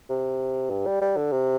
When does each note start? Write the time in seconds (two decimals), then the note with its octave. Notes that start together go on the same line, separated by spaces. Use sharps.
0.09 C3
0.70 G2
0.86 G3
1.01 G3
1.17 D3
1.32 C3